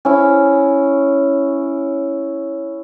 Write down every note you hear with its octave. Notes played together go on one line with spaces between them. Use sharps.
C#4 E4